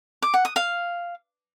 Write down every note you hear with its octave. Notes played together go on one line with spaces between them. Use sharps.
D6
F#5
D#6
F5